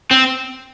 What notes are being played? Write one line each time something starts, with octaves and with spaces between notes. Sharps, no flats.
C4